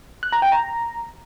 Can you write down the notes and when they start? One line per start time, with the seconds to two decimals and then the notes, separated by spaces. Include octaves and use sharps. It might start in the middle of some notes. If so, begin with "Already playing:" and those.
0.23 F#6
0.32 A#5
0.42 G5
0.52 A#5